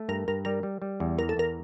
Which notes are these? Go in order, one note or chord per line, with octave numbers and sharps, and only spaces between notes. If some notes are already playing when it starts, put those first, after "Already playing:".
Already playing: A3
G2 A#4
G2 A#4
G3 A#4
G3
G3
E2
E3 A#4
A4
E2 A#4